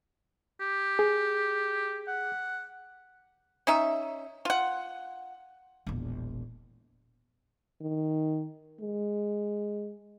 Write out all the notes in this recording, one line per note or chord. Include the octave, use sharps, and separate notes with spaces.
G4
G#4
F#5
C#4 D#4 E5
F4 F#5
E1 A#1
D#3
G#3